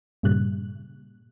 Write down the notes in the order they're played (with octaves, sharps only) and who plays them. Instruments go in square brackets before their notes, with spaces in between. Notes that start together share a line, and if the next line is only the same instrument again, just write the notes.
[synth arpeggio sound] G2 A#2 C#3 G3 F#6